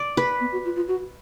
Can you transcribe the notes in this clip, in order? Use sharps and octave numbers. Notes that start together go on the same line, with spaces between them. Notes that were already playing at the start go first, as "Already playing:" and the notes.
Already playing: D5
B4
B3
F#4
F4
F4
F#4